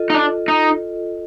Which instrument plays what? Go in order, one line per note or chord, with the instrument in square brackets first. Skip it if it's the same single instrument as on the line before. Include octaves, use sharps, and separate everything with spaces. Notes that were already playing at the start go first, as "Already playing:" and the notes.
Already playing: [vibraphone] F4 A4 D#5
[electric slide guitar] D#4
D4
D#4